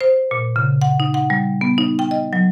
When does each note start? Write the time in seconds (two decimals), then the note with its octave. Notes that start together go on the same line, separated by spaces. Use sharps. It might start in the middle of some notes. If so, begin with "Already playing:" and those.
0.01 C5
0.31 A#2
0.56 C#3
0.82 F#5
1.00 D#4
1.14 F#5
1.30 G3
1.61 B3
1.78 D#4
1.99 G5
2.11 D#5
2.33 F#3